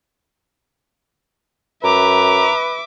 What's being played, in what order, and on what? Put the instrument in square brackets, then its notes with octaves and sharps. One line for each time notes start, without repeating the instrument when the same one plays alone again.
[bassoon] F#2 [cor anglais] B4 [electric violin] E5 D6 [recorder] A#5